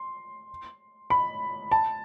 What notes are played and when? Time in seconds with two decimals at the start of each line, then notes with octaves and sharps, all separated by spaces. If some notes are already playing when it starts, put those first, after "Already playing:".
Already playing: C6
1.10 B5
1.72 A5